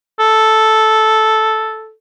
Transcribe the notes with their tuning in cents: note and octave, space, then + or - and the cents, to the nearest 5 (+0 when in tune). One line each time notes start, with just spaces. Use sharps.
A4 -5